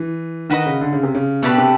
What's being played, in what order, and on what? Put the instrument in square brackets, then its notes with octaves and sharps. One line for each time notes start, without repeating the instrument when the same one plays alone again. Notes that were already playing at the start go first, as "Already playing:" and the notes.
Already playing: [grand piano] E3
[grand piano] D#3 [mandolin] F#4 B4 D#5
[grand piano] C#3
D3
C#3
C3
C#3
[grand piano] B2 [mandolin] A3 D4 G4 B4
[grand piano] C3